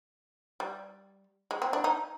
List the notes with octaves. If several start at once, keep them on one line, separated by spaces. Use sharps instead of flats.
G3
G#3
C4
D4
D#4